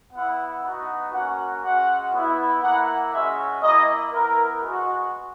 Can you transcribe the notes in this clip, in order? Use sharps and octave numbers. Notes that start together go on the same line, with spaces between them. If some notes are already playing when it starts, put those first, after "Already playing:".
B3 E4 F#5
B3 D#4 F#4
A#3 C#4 F#4 F#5
G#3 C#4 F#4 F#5
B3 E4
A#3 E4 F#5
G#3 C#4 F#4 E5
A#3 E4 D#5
B3 E4 A#4
G#3 B3 F#4